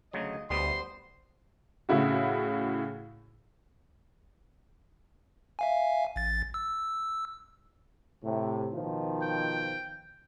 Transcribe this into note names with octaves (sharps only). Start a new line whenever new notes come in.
D2 C#3 F#3 D#5
D2 G3 B3 C5 C6
A2 C#3 E4 F#4
E5 F5 G#5
A1 A6
E6
A2 C3
B2 D#3 F3
G5